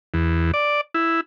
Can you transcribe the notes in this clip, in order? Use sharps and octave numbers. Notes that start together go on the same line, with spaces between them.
E2
D5
E4